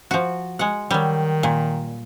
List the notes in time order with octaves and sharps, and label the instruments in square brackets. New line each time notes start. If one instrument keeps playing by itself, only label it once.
[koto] F3 F#4
G#3 F#5
[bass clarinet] D#3 [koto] F#3 G3
[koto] A#2